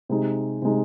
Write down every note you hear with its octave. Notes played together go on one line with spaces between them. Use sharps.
C3 G#3 D#4
C3 G#3 D#4